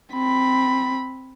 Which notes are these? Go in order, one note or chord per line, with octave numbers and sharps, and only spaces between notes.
C4 B5